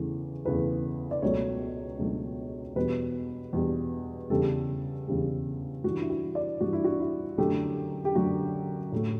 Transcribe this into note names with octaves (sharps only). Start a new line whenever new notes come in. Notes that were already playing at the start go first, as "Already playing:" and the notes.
Already playing: E2 C#3 E3 A3
E2 C#3 E3 A3 B4
D5
C#2 B2 F#3 A3 C#5
C#2 B2 F#3 A3
E2 B2 G3 B4
E2 B2 G3
E2 C#3 G3 A4
E2 C#3 G3
G2 E3 G3 F#4
E4
F#4
D5
G2 E3 G3 F#4
E4
F#4
E4
F#2 D3 F#3 A3 G4
G4
F#2 D3 F#3 A3 F#4
A2 F#3 A3